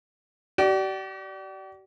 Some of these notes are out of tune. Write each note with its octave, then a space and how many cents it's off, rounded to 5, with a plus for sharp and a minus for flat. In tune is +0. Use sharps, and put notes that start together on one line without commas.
G4 -45 D5 +0